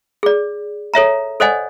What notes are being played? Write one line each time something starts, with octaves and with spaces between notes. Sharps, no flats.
G#4 D5
A4 C#5 E5 A#5
A4 C5 D5 D#5 F#5 G#5